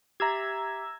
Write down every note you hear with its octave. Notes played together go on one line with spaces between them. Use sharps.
G4 E5 A#5 E6 G#6